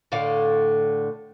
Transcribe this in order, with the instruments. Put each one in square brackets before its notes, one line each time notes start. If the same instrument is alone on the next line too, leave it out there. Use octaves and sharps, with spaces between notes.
[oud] A2 D3 F5